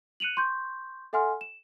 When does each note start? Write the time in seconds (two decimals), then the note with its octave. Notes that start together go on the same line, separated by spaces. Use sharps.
0.20 F#6 C#7 D#7 F7 F#7
0.37 C6 C#6 G6
1.13 A4 E5 F#5 G#5 C6 F6
1.41 E7